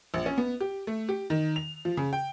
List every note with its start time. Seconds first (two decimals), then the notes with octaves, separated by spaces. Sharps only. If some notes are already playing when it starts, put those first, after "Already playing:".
0.14 A#1
0.26 C#4
0.38 B3
0.60 G4
0.87 A3
1.09 G4
1.30 D#3
1.56 F7
1.85 F3
1.97 C#3
2.13 G5